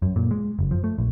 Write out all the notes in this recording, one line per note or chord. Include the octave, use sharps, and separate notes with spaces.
F#2
A#2
G#3
F#1
F3
A3
A#1